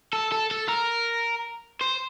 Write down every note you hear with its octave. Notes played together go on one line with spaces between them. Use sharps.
A4
A4
A4
A#4
C5